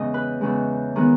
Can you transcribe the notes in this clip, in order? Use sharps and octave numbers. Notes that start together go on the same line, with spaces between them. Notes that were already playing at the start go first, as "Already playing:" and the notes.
Already playing: E2 C#3 G#3 D#5
B4
E2 C#3 G#3
D#3 G#3 B3